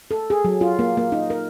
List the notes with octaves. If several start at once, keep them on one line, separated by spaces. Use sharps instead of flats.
A4
G#4
F#3
F4
A#3
A#3
D#4
A#4